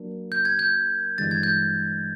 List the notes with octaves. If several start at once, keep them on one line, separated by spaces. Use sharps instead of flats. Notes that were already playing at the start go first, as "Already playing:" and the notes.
Already playing: F#3 A#3 D4
G6
G#6
G6
G2 E3 G#3 A6
G#6
G6